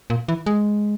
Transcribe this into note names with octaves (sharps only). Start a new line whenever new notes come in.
A#2
E3
G#3